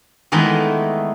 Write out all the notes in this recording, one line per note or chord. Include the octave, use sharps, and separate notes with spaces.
D#3 E3 G#3 A3 B3 D#4